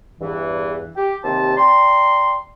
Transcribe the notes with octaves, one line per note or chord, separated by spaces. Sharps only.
E2 G2 E3
G4
D#2 C3 C4 C5 A5
D5 G5 A#5 C6